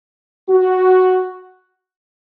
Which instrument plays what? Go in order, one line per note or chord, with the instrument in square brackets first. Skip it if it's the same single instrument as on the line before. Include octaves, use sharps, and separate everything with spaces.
[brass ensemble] F#4